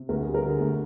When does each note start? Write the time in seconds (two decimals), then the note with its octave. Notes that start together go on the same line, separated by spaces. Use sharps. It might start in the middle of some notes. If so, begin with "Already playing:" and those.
Already playing: C3
0.09 D2 A#4
0.23 G#4
0.27 G3
0.34 A#4
0.43 D3 G#4
0.60 D2